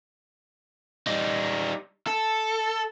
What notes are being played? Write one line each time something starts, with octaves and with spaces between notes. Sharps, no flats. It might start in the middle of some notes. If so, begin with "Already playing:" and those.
G3 D#4
A4